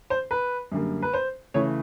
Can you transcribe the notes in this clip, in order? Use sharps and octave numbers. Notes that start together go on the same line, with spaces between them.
C5
B4
F#2 D3 G3 A#3
B4
C5
C#3 E3 A3 C#5